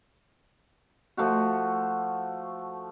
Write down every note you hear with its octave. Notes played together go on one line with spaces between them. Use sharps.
F3 A3 F4 F#4